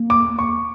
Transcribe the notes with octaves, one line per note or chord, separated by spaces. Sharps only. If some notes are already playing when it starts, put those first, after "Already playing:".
Already playing: A#3
D6
C#6